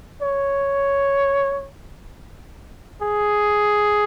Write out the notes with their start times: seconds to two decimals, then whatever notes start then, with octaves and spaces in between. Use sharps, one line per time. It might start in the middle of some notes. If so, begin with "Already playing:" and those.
0.22 C#5
3.01 G#4